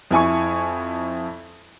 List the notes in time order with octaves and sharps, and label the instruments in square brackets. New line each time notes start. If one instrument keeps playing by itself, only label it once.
[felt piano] F2 E4 G#5 C#6